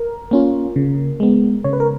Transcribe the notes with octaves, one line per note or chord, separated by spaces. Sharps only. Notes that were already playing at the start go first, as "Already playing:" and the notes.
Already playing: A#4
A#3 C#4 F4
C#3
G#3 B3
C#3 C#5
B4
A#4